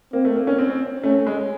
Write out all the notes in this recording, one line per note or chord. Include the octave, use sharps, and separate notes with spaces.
A#3 C4
A3
A#3
C#4
C4
C4
A3 C#4
A3
G#3